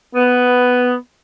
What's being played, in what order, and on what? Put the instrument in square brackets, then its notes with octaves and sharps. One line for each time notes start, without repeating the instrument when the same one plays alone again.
[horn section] B3